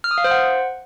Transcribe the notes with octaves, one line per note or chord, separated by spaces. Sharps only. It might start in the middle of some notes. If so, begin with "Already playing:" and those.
F6
D#6
F5
C5
F#5